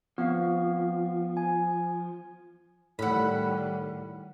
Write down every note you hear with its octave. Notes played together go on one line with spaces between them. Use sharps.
F3 B3 C4 F5
G#5
A2 D#3 G3 F#5 B5